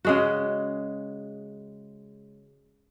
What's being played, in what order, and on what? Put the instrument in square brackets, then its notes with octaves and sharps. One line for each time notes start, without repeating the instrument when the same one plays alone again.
[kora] C#3 G#3 F#4